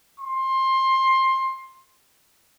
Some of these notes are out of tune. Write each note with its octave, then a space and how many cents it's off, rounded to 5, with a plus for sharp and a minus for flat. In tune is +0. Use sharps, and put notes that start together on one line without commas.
C6 +20